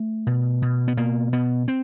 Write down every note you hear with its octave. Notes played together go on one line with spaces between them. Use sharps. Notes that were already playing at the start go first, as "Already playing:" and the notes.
Already playing: A3
B2
B2
B3
B2 A#3
B2 B3
C4